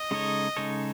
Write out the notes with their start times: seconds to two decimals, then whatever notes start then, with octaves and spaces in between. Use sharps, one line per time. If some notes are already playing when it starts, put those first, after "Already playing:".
Already playing: D#5
0.11 C#3 G#3 D#4 A4 C#5
0.57 C#3 G#3 D#4 A4 C#5